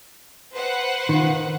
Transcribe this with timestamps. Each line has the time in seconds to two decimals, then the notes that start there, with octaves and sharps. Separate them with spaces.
0.53 B4 C5 F#5
1.09 D#3 F4